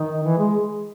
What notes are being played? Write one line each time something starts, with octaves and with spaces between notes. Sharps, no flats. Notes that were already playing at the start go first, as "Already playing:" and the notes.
Already playing: D#3
E3
G#3